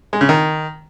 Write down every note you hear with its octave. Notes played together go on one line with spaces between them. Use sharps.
G#3
C#3
D#3